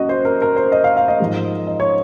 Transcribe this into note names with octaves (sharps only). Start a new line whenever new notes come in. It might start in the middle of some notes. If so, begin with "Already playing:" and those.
Already playing: F#2 A#3 F#4 D#5
C5
A#4
A#4
C5
D#5
F5
F5
D#5
G#2 F3 G#3
D#5
C#5